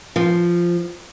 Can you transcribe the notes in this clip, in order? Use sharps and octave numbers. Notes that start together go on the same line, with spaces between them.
F3